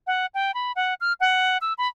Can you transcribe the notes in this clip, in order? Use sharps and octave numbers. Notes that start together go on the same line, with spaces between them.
F#5
G5
B5
F#5
F6
F#5
E6
B5